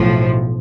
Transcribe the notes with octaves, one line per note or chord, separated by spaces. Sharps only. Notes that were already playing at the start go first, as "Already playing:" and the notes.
Already playing: B1 A2 F3